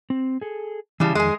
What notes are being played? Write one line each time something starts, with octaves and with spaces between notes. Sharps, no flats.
C4
G#4 A4
C#3 E3 G3 E4 A5
F2 D#3 G#3 G#4